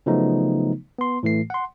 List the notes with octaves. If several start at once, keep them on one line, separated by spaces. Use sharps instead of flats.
C#3 F3 F#3 A3 B3 D#4
B3 C6
A2 E3 A3 C7
F#5 C6